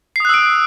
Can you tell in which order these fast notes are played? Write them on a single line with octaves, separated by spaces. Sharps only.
C7 D#6 F#6 E6 D7